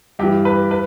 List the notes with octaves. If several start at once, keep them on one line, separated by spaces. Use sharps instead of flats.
G2 E3 G4
B4
B4